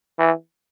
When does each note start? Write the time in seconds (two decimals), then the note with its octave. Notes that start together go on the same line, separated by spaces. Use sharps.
0.19 E3